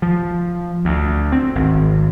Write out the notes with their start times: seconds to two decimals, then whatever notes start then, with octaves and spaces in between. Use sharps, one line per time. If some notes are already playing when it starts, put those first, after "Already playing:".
0.02 F3
0.85 D2
1.32 C4
1.55 G#1